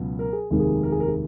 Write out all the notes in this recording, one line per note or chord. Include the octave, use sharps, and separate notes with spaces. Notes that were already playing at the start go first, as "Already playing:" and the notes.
Already playing: C#2 B2 F#3 B3
A#4
G#4
F1 D#2 D#3 G#3
G#4
A#4
G#4
A#4
G#4